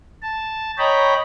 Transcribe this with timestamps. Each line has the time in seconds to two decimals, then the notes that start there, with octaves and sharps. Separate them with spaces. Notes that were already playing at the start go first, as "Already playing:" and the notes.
0.23 A5
0.78 C#5 D#5 G5 A#5 B5